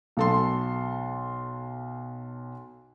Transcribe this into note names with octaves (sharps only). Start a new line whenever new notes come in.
B1 A4 C6